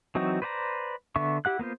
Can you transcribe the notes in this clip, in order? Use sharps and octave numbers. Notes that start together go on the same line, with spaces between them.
E3 F#3 C4 D#4 F#4
B4 C5 D5 G5 A#5
D3 B3 E5 C#6
E4 G4 F#5 F#6
A#3 B3 F4 C5